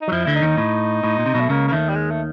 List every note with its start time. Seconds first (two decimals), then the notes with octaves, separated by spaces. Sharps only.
0.01 D#4
0.08 F#3
0.12 F2 F3 E4
0.24 D2 D3 E4
0.35 D#4
0.42 D#2 D#3
0.58 A2
1.04 A2
1.19 A#2
1.26 C3
1.34 B1 B2
1.40 A3
1.49 C#2 C#3 A#3
1.68 A#3
1.72 D#2 D#3 A3
1.89 G3
1.95 G#3
2.11 A3